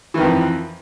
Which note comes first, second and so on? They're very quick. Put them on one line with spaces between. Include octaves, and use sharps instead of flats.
E3 D#3 F2